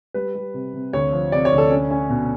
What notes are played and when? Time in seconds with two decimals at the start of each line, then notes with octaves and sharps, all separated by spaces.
0.14 G3 B4
0.35 G3
0.54 C3
0.73 C3
0.93 D2 C#5
1.12 F3
1.32 C3 D5
1.45 C#5
1.52 D2
1.58 A4
1.71 C#4
1.91 C#4
2.10 B2